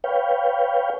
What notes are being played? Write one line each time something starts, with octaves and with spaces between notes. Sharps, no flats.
B4 C#5 F5 G5